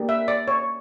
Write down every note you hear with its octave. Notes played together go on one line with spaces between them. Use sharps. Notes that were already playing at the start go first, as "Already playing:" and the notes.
Already playing: A#3 D4 G4
E5
D5
C#5